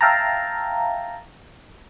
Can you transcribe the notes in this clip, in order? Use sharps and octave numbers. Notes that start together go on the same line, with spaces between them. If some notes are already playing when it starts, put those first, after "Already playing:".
E5 F5 G5 A5 A#5